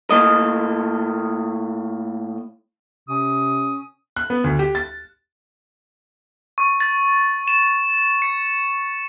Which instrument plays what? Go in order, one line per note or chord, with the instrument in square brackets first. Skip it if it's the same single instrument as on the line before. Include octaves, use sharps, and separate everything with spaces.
[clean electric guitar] A2 A#3 D#5
[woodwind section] C3 C#4 D#6
[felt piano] F#6
B3
D2
G4
A6
[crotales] C#6
A6
E7
C#7